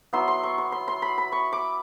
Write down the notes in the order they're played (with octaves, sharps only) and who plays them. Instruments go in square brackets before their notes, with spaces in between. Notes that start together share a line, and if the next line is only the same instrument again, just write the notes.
[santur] F#3 B3 E4 C6
C6
C#6
C6
C6
C6
B5
B5
C#6
D6